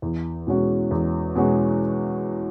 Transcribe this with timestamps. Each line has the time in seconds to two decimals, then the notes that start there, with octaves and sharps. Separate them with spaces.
0.02 E2
0.47 B2 G#3 C#4 F#4
0.91 E2
1.35 B2 G#3 C#4 F#4